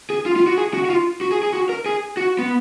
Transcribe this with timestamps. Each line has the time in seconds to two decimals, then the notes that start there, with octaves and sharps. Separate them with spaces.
0.10 G#4
0.26 F4
0.36 F4
0.47 F#4
0.58 G#4
0.74 F#4
0.85 F#4
0.90 F4
1.21 F#4
1.32 G#4
1.43 G#4
1.54 F#4
1.69 A#4
1.86 G#4
2.17 F#4
2.39 B3